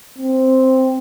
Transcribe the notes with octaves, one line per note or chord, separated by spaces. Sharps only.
C4